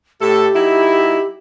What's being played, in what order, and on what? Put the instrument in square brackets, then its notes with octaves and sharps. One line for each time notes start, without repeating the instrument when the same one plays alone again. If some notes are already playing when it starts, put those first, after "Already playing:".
[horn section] A2 A3 A4 [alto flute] G4
[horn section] F#3 D#4 E4